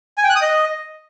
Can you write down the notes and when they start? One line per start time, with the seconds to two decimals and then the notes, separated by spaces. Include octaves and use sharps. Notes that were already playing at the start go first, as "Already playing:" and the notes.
0.18 G#5
0.24 G5
0.30 F#6
0.36 D#6
0.42 D#5